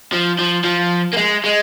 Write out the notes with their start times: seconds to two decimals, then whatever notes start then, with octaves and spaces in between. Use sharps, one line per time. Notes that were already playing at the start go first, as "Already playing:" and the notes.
0.12 F3
0.39 F3
0.65 F3
1.13 A#3
1.17 G#3
1.44 G#3